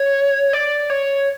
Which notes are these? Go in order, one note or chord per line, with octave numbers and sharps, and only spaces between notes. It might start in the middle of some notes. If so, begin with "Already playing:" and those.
Already playing: C#5
D5
C#5